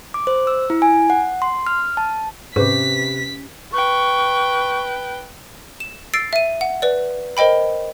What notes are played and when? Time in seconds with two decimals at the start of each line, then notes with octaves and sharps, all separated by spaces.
0.14 D6
0.27 C5
0.47 E6
0.70 E4
0.82 G#5
1.10 F#5
1.42 C6
1.67 F6
1.97 A5
2.56 G#2 C3 C#4 G4 B4 D6 B6
3.73 B4 G5 C#6
5.80 E7
6.14 E6 A6 C7 D7
6.33 E5 D#7
6.61 F#5
6.82 B4 D5
7.37 A#4 C5 D#5 G5 B5